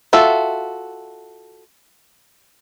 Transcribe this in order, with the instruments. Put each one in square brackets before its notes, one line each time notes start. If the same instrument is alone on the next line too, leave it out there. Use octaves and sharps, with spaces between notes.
[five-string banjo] F4 F#4 A4 E5